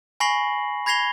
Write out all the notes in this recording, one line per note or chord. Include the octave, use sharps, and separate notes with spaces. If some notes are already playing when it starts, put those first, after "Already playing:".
G#5 B5 C#6 A#6 C7 F#7
B5 G#6 A#6 C7 F7 G7